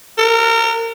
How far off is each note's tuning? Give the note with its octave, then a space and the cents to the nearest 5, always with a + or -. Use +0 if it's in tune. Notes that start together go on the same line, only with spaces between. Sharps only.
A#4 -30